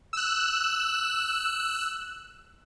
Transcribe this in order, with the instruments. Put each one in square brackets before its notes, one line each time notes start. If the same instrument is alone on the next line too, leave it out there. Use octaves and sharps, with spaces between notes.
[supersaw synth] E6 F#6